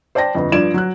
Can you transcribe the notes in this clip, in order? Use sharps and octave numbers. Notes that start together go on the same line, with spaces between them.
C5 D5 G5 A5 A#6
G1 F2
G2 F3 D5 G#6 D7 E7
F#3 F#6